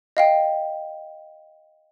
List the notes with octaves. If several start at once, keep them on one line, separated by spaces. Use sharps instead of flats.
D#5 F5 G5